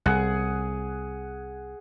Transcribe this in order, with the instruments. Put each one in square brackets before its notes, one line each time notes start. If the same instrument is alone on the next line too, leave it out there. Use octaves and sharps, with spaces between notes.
[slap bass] C2 [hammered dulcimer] G#4 F#5